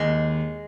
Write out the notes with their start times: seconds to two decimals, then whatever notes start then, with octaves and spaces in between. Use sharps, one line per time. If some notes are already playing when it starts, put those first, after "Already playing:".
Already playing: D#2 G#3